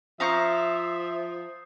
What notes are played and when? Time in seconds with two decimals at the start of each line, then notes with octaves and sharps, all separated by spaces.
0.20 F3 E5 F5 A#5 C#6 D#6 G6 C7